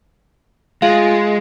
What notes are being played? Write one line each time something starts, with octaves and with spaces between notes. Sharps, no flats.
G#3 F4 F5